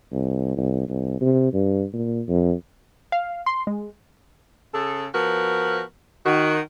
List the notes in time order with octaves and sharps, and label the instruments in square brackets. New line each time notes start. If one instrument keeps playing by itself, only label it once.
[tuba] C2
C2
C2
C3
G2
A#2
F2
[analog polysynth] F5
C6
G#3
[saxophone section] C#3 G#4 A4
F3 B3 F#4 A#4
D#3 F#4